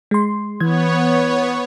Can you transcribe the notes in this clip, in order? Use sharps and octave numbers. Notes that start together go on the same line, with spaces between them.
G#3 C6
E3 B3 C#5 G#6